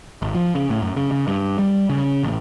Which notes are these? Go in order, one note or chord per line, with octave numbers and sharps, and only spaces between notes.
G#1
F3
C#3
A2
F#2
C#3
C#3
G2
G3
C#3
A1